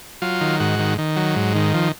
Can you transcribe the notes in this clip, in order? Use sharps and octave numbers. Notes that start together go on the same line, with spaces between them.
F#3 F4
D#3
G#2 F#4
D#3
D#3
F#3
G#2
D#3
F3